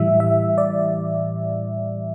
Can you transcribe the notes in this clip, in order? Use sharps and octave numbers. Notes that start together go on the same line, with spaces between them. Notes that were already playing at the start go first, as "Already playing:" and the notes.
Already playing: A2 E3 G3 E5
E5
D5